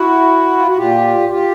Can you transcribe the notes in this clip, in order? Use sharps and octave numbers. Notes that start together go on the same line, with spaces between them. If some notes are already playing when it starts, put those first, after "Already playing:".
Already playing: E4 F#4
F4
F#4
A#2 F4 G4
F4 G4